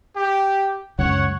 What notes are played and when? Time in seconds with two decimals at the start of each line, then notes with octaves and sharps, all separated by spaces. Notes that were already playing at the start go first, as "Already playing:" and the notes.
0.16 G4
0.99 C#2 F#2 C#3 C#5 F#5